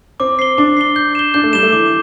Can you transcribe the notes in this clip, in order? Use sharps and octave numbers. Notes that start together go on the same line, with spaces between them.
C4 D6
C7 G7
D4 D6
C7 G7
G6
E7 G7
D4 G6
A3
G3 E7 G7
A3
E3 D6